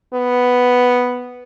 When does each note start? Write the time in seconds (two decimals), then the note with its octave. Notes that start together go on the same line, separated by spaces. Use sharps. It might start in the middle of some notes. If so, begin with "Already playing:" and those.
0.14 B3